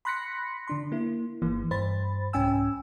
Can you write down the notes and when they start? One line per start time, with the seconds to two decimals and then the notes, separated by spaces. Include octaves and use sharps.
0.05 B5 C6 F#6 A#6 B6 C#7
0.68 D3 D4 C6
0.92 A#3 E4
1.42 G1 E3 A#3
1.71 G2 C5 B5 A6
2.33 C2 G#2 C#4 G5 G#5 E6